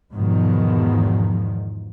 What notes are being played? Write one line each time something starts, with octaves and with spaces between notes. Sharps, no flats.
E2 G#2 B2 D#3 F3